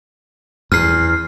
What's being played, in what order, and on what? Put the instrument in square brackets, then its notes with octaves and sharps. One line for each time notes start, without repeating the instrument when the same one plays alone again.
[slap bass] E2 [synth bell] F6 C7